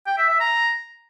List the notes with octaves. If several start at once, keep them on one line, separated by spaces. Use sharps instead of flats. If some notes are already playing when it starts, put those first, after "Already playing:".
G5
E5
E5
A#5